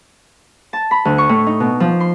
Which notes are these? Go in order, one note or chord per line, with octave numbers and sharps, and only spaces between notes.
A5
B5
D2
C#6
A2
D#4
B2
F3
C6